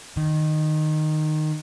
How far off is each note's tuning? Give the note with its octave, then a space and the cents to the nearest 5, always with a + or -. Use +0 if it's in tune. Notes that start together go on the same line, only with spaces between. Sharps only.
D#3 -15